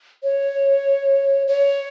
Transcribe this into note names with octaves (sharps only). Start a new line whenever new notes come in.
C#5
C#5